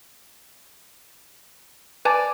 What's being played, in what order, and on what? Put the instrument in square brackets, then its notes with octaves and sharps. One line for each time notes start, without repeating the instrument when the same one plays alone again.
[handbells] B4 G#5 A5 [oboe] D5